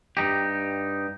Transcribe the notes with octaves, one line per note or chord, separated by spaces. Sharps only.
G2 D#4 G4